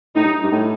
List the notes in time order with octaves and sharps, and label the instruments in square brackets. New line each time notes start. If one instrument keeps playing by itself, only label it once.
[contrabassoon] A2 [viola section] D#4
[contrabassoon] G2
G2
A2